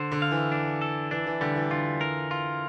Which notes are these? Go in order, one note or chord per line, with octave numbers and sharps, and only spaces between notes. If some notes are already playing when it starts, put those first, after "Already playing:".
Already playing: D3 C5
D3
F5
E3
D4
A4
E3 D4
E3
D3 G3
E3
D3 F4
A#4
F4